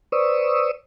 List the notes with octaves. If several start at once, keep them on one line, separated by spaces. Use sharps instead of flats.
B4 C5 D5 C#6 D#6 E6